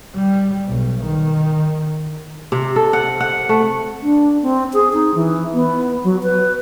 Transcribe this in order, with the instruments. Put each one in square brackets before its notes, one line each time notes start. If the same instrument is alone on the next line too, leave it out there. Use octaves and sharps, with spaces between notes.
[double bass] G3
B1
D#3
[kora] C3
A4
F#5
F#5
A3
[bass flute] D4
C4
G#4
D#4
E3
B3
F#3
B4